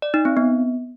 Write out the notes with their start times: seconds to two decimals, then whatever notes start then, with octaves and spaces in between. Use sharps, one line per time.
0.02 D5
0.14 D#4
0.25 C4
0.37 B3